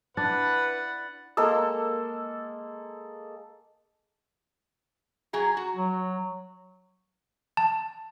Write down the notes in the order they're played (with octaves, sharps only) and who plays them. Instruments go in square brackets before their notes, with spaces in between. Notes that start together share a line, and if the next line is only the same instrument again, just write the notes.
[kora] D4 [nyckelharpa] E4 F#5 [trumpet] B4 [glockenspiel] F#6 A6
[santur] G#3 A#3 A4 E6
[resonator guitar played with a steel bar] F#3 G#4 A#5
F#4
[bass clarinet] F#3
[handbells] A5